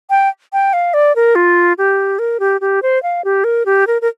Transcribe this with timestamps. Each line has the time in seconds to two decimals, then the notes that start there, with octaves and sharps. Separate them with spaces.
0.10 G5
0.53 G5
0.73 F5
0.94 D5
1.16 A#4
1.35 F4
1.78 G4
2.19 A#4
2.40 G4
2.61 G4
2.83 C5
3.03 F5
3.24 G4
3.44 A#4
3.66 G4
3.87 A#4
4.02 A#4